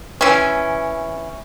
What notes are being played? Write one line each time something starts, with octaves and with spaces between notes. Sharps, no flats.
E3 C#4